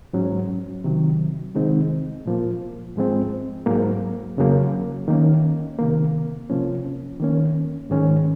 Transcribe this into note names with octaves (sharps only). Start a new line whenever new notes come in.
G#2 F#3 C#4
C3 D#3 F#3
C3 D#3 G#3 C4 D#4
A#2 F3 A#3
G#2 F3 G#3 C4
G#2 F#3 A#3
F2 C#3 F#3 A#3
D#3 A#3 C#4
C3 D#3 A#3
C3 F3 A#3 C#4
D#3 A#3 C#4
G#2 D#3 G#3 C#4